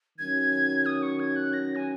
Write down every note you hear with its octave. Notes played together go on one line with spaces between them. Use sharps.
D#3 F#3 C#4 G#6
D#6
C#6
G#6
F#6
A#6
G#5